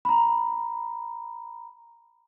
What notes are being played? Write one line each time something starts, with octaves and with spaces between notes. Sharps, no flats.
A#5 B5